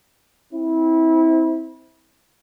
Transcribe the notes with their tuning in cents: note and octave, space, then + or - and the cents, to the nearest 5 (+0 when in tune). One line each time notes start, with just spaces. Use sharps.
C4 +0 E4 -25